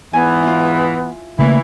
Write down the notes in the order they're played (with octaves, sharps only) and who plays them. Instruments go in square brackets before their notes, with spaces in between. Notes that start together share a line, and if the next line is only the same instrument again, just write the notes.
[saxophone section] E2 G#2 E3 [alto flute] B3 [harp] G#5
[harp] E4 F4
[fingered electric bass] C#3 A3 A#3 [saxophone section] E3 E4